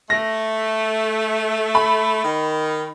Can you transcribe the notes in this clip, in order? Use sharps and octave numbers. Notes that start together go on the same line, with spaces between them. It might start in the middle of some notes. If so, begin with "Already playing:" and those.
A3 A#6
B5
D#3